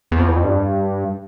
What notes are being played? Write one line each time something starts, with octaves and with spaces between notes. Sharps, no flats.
E2
F2
E2
F2
G2